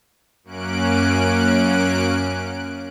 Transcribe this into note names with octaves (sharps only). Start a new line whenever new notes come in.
F#2 A#3 C#4 F#6 D7